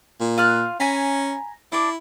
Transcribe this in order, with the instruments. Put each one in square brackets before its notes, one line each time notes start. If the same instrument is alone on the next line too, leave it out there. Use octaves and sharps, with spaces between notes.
[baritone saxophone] A#2
[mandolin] F4 F5 F#6
[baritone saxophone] C#4 [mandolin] G#5 A#5 B5
[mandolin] D4 D6 [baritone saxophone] E4